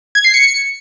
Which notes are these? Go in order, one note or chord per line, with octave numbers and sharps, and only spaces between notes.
G#6
C7
C#7